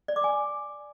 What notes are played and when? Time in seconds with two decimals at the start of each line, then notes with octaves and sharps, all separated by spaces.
0.08 D5
0.16 D6
0.24 G#5